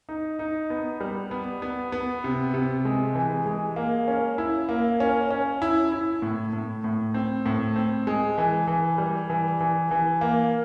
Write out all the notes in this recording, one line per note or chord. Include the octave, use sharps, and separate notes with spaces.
D#4
D#4
B3
G3
B3
B3
B3
C3
C3
G#3
E3
G#3
A#3
C#4
E4
A#3
C#4
C#4
E4
E4
A2
A2
A2
C4
A2
C4
G#3
E3
E3
G3
E3
E3
E3
A#3